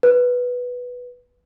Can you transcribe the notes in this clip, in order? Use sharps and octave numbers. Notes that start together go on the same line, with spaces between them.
B4